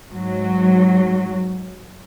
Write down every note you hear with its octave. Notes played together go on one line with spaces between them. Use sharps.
G#2 F#3